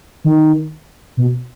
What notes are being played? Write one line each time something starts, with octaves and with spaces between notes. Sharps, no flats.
D#3
B2